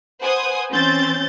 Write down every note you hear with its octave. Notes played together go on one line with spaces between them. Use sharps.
B4 C5 F#5 G#5 D#6
E3 C4 C#4 G6 A6